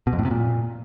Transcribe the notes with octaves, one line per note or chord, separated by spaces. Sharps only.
B2
F2
A2
C3
A#2